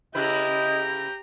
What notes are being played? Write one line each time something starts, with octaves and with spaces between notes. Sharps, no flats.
C#3 E4 G4 B4 D#5 A#5 G6